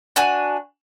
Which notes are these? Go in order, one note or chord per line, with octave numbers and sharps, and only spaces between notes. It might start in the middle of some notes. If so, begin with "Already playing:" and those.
D4 F#4 G#5